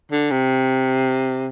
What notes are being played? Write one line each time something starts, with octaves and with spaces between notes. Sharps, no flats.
D3
C3